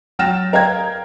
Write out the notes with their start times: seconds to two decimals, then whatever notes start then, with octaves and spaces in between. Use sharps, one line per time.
0.19 F#3 G5 F6 A6 A#6 E7
0.53 A#4 D#5 F5 G5 A#5 G#6